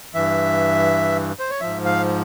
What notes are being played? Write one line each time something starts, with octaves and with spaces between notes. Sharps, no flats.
G2 E3 E5
C5
C#5
G#2 F3 E5
F5